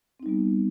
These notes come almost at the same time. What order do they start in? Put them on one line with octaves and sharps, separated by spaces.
C4 D#4 G3 B3